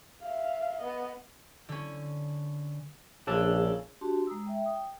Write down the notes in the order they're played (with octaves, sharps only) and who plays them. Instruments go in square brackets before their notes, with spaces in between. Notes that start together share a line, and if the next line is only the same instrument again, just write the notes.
[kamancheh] E5 F5
B3 D#5
[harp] D3 C#4
[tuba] A#1 [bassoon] C#3 [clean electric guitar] D4 A4
[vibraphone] D4 F#4 G4 A5 C6
G#3 A#5 D#6 E6
E5 G5
G5 D#6